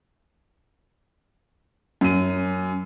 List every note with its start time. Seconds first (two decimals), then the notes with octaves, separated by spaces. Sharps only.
2.01 F#2 D#7